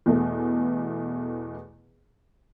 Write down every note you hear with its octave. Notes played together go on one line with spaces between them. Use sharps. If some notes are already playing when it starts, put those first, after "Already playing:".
E2 B2 A3